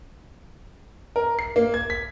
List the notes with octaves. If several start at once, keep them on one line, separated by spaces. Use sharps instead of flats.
A#4
C7
A#3
G#6
B6